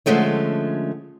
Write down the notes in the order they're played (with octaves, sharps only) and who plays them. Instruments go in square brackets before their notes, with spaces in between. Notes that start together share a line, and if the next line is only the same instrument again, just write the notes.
[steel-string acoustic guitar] D3 F3 G#3 A3 C#4